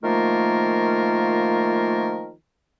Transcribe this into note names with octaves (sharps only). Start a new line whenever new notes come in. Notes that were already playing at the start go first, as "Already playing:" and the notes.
D#3 F3 A3 A#3 F4 A#4